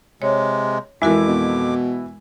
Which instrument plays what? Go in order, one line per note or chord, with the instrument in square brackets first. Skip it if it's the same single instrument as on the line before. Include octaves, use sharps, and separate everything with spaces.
[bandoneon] C3 G#3 [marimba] C#5
[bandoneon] F2 D6 [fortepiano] E3 E4 [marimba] G#3 F#4 A#4
[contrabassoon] B2